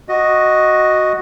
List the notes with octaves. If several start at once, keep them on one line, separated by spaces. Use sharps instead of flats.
F#4 D#5